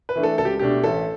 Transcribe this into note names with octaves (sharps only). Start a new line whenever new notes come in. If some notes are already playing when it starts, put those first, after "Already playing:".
B4
E3 A3 D4
A4
C#2 A4
G4
B2 A3 D4 G4
A1 A4